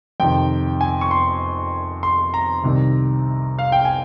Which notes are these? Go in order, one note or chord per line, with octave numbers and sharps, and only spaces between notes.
F2 C3 D#3 G5
G#5
C#6
C6
C6
A#5
C2 C3 D#3
F5
G5
G#5